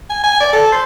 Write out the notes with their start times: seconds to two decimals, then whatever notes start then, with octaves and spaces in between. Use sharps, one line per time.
0.10 G#5
0.24 G#5
0.40 D5
0.53 A4
0.72 C5